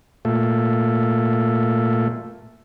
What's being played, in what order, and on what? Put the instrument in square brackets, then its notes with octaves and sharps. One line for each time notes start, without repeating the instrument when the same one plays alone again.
[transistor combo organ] A#2 A3